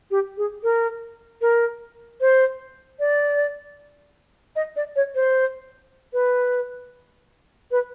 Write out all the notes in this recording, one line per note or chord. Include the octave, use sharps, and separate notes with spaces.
G4
G#4
A#4
A#4
C5
D5
D#5
D5
C#5
C5
B4
B4